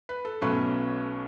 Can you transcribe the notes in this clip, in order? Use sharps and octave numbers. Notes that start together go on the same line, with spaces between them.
B4
A4
B1 B2 F#3 A3 C#4 B4